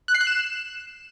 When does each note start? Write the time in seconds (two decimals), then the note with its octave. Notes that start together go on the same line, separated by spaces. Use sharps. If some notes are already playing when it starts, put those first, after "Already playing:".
0.08 F#6
0.14 C7
0.21 F#6
0.27 E7